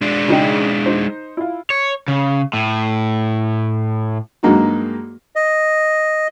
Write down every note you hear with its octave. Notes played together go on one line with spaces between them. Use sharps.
G#3 D4
C#3 D#4 G5
D#4 C5
E4 F4
C#5
C#3
A2
G2 F#3 G#3 A#3 D#4 F#4
D#5